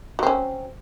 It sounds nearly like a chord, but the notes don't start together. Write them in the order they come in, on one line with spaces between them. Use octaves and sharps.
F#3 C4 C#4